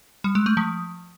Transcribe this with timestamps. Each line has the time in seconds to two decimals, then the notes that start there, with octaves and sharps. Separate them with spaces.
0.24 G3
0.35 G#3
0.46 A3
0.57 F3